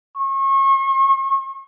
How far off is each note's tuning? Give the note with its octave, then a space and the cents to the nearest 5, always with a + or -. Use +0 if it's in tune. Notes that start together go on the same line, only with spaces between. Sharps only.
C#6 -35